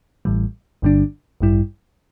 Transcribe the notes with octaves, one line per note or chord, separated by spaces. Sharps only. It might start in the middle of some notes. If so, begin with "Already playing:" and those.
A1 A2 E3 G3
G1 G2 D3 G3 D4
A1 G2 G3 E4